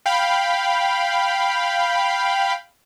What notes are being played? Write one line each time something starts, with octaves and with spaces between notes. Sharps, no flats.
F5 G5 B5